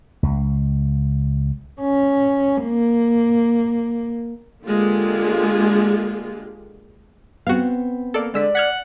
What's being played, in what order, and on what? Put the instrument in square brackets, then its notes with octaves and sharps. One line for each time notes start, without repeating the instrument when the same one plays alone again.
[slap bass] C#2
[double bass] C#4
A#3
[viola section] D3 G#3 A#3 F4 G4
[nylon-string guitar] B3 C4 [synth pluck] F#4 F5
[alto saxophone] A#3 [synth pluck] A4 D5
[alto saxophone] D3 [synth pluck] G#3 E6 B6 [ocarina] D5
[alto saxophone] F#5 [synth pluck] F6 G#6 B6